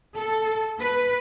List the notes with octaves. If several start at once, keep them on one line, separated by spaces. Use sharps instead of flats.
A4
B4